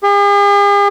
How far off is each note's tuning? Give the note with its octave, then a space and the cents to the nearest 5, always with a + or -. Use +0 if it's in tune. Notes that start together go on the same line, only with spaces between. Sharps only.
G#4 -45